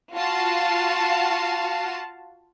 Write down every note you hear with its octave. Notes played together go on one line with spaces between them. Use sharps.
F4 F#4 F5 A5